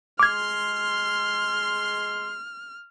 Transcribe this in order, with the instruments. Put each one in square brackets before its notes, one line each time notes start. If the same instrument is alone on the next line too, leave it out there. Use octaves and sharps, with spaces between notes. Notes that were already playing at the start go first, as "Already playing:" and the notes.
[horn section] G#3 C6 [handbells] D6 G#6 [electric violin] F6